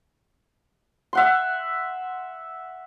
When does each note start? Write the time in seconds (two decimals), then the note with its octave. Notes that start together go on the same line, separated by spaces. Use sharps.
1.13 E5 F#5 C6